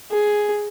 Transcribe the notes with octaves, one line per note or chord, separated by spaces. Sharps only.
G#4